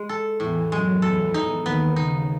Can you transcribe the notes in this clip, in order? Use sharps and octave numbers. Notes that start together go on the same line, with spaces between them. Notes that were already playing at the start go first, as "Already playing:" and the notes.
Already playing: G#3
A4
E2 A2 E3
F#2 F#3 G#3
E2 E3 A4
D#4
D#2 D#3 B3
C#3 D#4